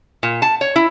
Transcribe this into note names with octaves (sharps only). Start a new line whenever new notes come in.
A#2
A5
C#5
E4